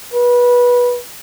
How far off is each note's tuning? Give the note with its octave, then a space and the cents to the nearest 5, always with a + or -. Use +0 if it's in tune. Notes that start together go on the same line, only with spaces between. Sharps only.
B4 -20